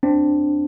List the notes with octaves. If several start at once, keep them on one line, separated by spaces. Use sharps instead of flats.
C4 D4